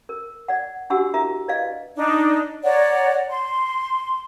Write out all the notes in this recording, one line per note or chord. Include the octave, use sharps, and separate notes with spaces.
A#4
D5 F#5
D4 F#4 G4 F#5 E6
E4 A#4 E5 A#5
B4 D5 D#5 F5
D4 D#4
C#5 D5 F#5 A#5
C6